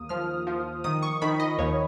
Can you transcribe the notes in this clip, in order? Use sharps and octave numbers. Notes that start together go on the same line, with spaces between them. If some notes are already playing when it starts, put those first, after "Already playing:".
Already playing: D#2 A#3 D#6
F3 F6
F3
D#3 D#6
C#6
D#3 B5
D#5
D#2 C#5